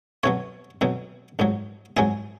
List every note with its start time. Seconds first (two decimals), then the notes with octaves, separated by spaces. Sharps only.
0.23 B1 B2 F#3 C#5
0.81 B1 B2 F#3
1.39 A#1 G#2 F#3
1.97 A#1 G#2 F#3 G#4